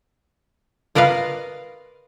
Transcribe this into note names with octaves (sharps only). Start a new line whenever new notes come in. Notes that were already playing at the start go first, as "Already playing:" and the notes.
F4 A#4 B4 D#5 F5